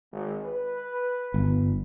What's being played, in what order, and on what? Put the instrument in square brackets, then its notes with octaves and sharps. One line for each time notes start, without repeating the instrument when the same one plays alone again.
[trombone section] G#1
B4
[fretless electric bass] G1